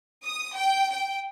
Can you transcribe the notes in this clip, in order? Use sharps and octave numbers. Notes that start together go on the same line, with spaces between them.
D#6
G5
G5